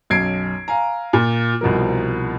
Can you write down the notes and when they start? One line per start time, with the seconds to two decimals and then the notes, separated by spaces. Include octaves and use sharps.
0.10 B1 F#2 G#6 C7 D7
0.68 F5 G#5 A#5
1.13 A#2
1.61 C2 B2 F3 A#4